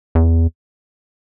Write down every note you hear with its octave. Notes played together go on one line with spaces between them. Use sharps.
E2